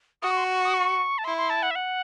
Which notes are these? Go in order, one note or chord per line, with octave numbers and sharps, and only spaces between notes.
F#4 D#6
C#6
C6
C#6
D#6
C#6
A5
E4 C6
C6
A5
F#5
E5
F#5